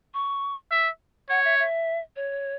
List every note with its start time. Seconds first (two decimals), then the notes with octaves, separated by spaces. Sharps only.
0.14 C#6
0.71 E5
1.29 C#5 F#5
1.45 E5
1.59 E5
2.16 C#5